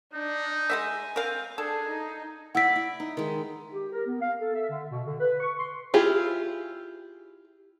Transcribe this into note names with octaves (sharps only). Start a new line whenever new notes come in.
D4 D#4
G#3 B3 E5 G#5
C4 A#4 F5
D4 G#4 A4
D#4
E4 D5 F#5 E6 B6
E4
D#4
D#3 G#3
G4
A#4
B3
F5
A4
E5
D3
B2
D3
B4
C#6
C6
E4 F4 G4 G#4